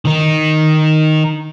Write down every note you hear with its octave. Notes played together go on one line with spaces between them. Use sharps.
D#3 D#4